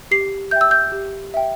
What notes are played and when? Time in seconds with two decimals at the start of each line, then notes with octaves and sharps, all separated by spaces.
0.11 G4 C7
0.51 E5 G5 G6
0.61 E6
0.71 G6
0.92 G4
1.34 E5 G5